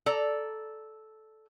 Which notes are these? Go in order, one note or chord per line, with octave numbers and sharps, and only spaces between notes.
A4 D5 A#5